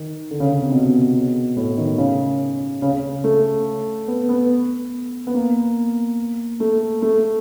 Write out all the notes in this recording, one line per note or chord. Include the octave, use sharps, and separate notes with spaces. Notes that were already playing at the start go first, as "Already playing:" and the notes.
Already playing: D#3
D3
C#3
C#3
C3
B2
A2
D#3
C#3
C#3
C#3
A3
B3
B3
B3
A#3
A3
A3